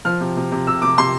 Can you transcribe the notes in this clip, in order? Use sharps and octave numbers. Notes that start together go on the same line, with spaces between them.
F3 F6
C3
C3
C3
C3 E6
C3 D6
C3 C6